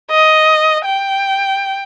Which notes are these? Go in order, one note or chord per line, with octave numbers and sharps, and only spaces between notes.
D#5
G5